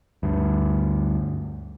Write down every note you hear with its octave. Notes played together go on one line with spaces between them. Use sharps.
D2 G2